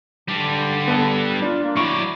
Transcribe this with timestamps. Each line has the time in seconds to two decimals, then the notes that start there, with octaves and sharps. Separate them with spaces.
0.28 D3 G3 D4
0.88 B3 A4
1.42 D4 F4
1.63 A#3
1.77 F#3 E4 D5 C#6